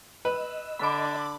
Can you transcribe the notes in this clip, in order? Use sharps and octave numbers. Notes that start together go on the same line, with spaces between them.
B4 D#5 E6
D3 D4 B5 D6